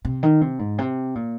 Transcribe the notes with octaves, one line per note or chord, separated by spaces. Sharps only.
C3
D#3
C3
G#2
C3
A#2